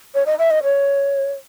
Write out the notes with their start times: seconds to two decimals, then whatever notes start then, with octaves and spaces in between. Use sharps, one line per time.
0.15 C#5
0.26 D#5
0.39 E5
0.51 D#5
0.64 C#5